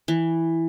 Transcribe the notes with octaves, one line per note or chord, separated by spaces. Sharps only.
E3